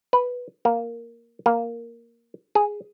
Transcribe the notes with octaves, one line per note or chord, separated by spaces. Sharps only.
B4
A#3
A#3
G#4